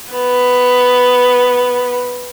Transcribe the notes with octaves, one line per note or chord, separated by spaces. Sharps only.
B3